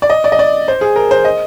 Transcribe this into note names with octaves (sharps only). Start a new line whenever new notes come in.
D5
D#5
D5
D#5
D5
C5
G#4
A#4
C5
D#5